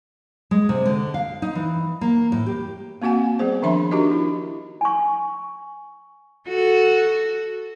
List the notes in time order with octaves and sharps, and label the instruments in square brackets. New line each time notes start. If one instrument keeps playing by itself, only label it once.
[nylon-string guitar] G#3
C3
D3
F5
D#4
E3
A#3
A2
G4
[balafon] A#3 C4 F#4 F#5 G#5
G3 B3 G#4 C5
D#3 F3 D4 E5 B5 C6
D4 D#4 F#4 G4 A#4 D#5
E4
[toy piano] G#5 C#6
[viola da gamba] F#4 A4